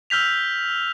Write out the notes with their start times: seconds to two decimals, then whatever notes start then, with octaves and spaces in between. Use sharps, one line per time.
0.10 E6 F6 G6 B6 F7